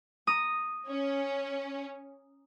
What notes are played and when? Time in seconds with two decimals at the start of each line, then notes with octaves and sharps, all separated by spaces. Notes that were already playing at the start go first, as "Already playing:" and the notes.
0.27 A#5 D#6
0.88 C#4